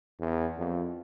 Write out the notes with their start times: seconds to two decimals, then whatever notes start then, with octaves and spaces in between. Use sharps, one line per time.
0.20 E2
0.58 F2